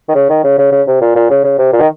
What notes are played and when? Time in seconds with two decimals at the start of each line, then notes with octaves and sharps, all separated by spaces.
0.09 D#3
0.15 C#3
0.29 D#3
0.44 C#3
0.58 C#3
0.72 C#3
0.87 C3
1.01 A#2
1.16 A#2
1.30 C#3
1.44 C#3
1.58 C3
1.73 A#2
1.81 D#3